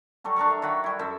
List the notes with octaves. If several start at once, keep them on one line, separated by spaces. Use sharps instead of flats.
F#3 G3 A4 C#6
D4 A4 A#4 C#6
E5
D#3 F#3 F#4 B5
G3 E4
F#2 A4 C5 E5